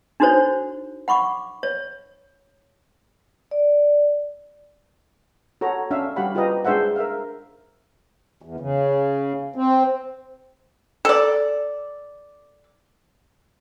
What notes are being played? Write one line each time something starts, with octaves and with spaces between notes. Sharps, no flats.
D4 D#4 F#4 A4 C5 C#5
F#5 B5 C#6 D6
C#5
D5
F#4 A4 C#5 A#5
C#4 D4 E5 F5
G3 F#4 G4 F5 F#5 B5
F4 G4 B4 C5 D#5 A#5
G#3 D4 G#4 C5 E5 F#5
A#4 E5 F5
E2
C#3
C4
A4 D5